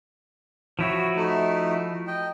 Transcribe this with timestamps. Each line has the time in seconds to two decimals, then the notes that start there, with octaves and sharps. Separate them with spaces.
0.79 F3 E4 F#4 C#5
1.16 A3 D#4
2.07 D#5 G5